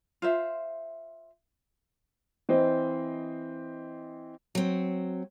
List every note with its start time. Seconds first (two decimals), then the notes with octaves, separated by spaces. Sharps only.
0.22 F4 C5 E5
2.49 E3 C4 C5 D#5
4.55 F#3 C4